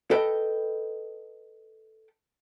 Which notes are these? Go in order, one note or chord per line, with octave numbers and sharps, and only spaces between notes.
A4 B4 D#5 G5